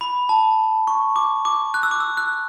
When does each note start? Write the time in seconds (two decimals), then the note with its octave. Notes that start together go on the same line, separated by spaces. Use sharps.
0.01 B5
0.29 A5
0.87 C#6
1.16 D6
1.45 D6
1.74 F#6
1.83 E6
1.91 D6
2.00 E6
2.17 F#6